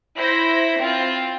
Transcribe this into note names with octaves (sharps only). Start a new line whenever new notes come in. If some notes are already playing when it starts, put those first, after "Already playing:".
E4 C5 A#6
C4 F4